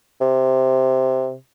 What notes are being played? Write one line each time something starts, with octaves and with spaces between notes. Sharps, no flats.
C3